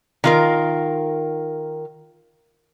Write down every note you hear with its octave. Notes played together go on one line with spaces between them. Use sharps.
D#3 F4 A#4